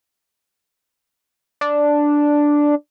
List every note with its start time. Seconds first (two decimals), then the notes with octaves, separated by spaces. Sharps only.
1.61 D4